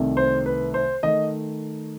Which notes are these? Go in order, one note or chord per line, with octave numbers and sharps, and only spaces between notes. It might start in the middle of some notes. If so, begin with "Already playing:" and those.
Already playing: C2 C3 D#3 A3
C5
B4
C5
D#3 A3 D#5